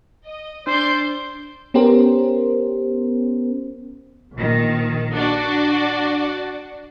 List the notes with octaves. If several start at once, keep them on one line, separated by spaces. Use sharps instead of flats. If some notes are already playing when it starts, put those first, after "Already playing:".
D#5
D4 C5 D5 C6 G6
B3 C#4 G4 A#4 C5
A#1 D#3
D4 F#4 D5